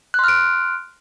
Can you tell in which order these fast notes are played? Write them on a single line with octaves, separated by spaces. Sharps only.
F#6 C6 F6 D7